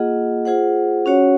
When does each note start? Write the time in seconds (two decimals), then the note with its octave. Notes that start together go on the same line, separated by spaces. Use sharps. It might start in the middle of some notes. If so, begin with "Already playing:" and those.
Already playing: A#3 F4 G#4 D#5 F#5
0.45 F4 G#4 C5 F#5
1.06 C#4 F#4 C#5 F#5